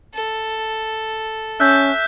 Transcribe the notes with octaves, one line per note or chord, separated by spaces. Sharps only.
A4
C#4 E5 E6 F#6 G6